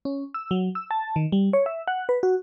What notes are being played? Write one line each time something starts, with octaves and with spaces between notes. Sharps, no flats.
C#4
E6
F#3
E6
A5
D#3
G3
C#5
E5
F#5
B4
F#4